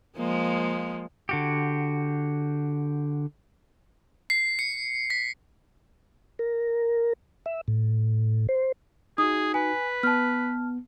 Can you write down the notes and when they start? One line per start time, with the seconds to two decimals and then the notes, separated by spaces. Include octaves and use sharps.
0.17 F3 G#3 A#3
1.29 D3 F#4 G4
4.30 C7
4.59 C#7
5.10 B6
6.39 A#4
7.46 E5
7.68 A2
8.49 C5
9.18 D#4 F#4 G#4 D#6
9.54 B4 G#5
10.03 B3 A5 F6